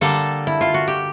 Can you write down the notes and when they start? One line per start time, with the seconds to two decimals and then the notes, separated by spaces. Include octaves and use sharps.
0.01 D3 G3 A#3 A4
0.47 E4
0.61 F4
0.74 F#4
0.88 G4